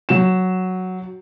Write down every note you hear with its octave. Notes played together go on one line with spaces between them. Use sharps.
F#3 E7